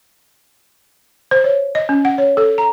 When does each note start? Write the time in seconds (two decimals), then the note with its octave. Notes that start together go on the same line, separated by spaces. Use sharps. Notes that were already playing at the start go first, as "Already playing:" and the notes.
1.31 C5
1.44 C#5
1.75 D#5
1.89 C#4
2.05 F#5
2.18 C#5
2.37 A4
2.58 A#5